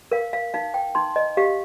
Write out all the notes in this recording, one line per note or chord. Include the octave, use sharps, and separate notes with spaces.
A#4 F5
F5
D#4 F5
G5
D#4 C6
D#5
G4 F5